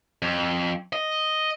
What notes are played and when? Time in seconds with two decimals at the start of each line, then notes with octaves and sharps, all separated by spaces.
0.22 F2
0.93 D#5